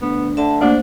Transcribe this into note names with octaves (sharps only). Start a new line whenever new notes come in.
D2 B3
D3 E5 A5
A3 A#3 D4 G4 C5